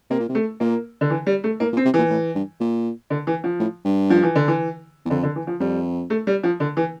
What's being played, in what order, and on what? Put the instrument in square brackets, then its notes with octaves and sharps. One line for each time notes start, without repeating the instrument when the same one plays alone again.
[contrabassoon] C3 [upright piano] A#3
[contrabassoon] A#2
C3
[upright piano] A3
[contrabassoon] A#2 [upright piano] A#3
[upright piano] D3
E3
G3
A3
[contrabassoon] A2 [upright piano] A#3
[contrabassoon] A#2
[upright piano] C4
[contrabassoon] C3
[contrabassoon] A#2 [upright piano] E3
[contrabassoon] A2
G2
A#2
[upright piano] D3
E3
F3
[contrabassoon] A2
G2
[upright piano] F3
E3
D3
E3
[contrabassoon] E2
[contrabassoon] F2 [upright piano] D3
[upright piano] D3
E3
F3
[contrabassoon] F2 [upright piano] G3
[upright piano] A3
G3
F3
D3
E3